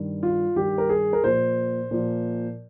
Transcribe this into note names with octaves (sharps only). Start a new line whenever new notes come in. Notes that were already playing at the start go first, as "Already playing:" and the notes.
Already playing: G2 D#3
F4
G2 D#3 G4
A#4
G#4
A#4
A#2 F3 C5
A#2 F3